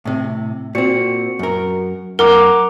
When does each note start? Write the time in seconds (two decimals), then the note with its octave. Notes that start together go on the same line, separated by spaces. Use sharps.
0.05 A2 C3
0.75 A#2 C4 F#4 C#7
1.39 F#2 A#4
2.19 F#2 A#4 F#5 A#5 D6